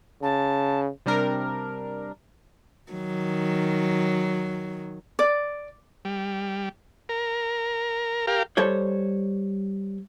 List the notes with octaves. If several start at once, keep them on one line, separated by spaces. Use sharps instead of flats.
C#3 A5
C3 G3 D4 A#4
D#3 F#3
D5
G3
A#4
G4 A#4 F5
G3 A4 C5 C#5